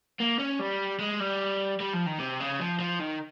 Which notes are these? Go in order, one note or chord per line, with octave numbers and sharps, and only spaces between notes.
A#3
C#4
G3
G#3
G3
G3
F3
D#3
C3
C#3
F3
F3
D#3